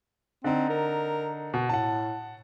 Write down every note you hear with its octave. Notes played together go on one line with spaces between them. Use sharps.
D3 C4 D#4
A#4
B2
A2 F#5 A5